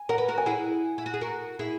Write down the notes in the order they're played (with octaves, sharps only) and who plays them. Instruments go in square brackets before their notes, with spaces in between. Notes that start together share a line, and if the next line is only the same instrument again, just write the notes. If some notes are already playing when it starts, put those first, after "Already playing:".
Already playing: [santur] G#5
[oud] A#4 [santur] F#5
[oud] B4
F#4 A#4
[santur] G#5
[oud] E4 G#4 [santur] F#5
[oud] E4
F#4
G#4
F#4 A#4
E4 G#4